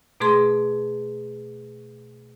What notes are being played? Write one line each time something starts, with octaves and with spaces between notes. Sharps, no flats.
B2 A3 G#4 C6